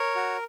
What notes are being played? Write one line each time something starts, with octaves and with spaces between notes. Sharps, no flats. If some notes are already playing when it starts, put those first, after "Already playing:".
Already playing: A#4 C#5
F#4